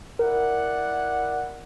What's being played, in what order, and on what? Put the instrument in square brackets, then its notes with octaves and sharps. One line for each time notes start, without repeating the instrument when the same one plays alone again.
[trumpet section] E4 D5 F#5 [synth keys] A#4